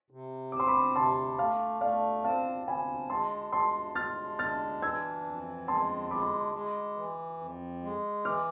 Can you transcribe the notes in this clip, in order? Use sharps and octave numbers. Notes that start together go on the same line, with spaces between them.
C3
C4 D6
C6
B5 D6
C3 A5 C6
A3 F5 A5
A3 D5 F5
C4 F5 A5
C4 G#5 B5
G#3 A5 C6
G#3 A5 C6
G#3 F6 A6
D4 F6 A6
E3 E6 G#6
F2
G#3 A5 C6
G#3 B5 D6
G#3
E3
F2
G#3
E3 D6 F6